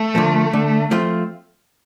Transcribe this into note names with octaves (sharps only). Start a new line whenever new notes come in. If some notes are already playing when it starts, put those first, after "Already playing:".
Already playing: A3
D3 F3 A#3
D3
F3 A3 C4 F4